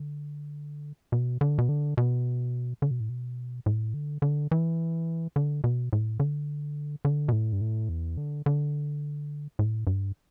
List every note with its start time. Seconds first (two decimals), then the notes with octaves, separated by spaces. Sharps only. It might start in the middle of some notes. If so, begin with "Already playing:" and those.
Already playing: D3
1.12 B2
1.41 D3
1.58 B2
1.69 D3
1.97 B2
2.82 D3
2.91 B2
3.00 A2
3.09 B2
3.66 A2
3.94 D3
4.22 D3
4.51 E3
5.36 D3
5.64 B2
5.93 A2
6.20 D3
7.05 D3
7.29 B2
7.33 A2
7.52 G2
7.61 A2
7.89 E2
8.17 D3
8.46 D3
9.59 A2
9.87 G2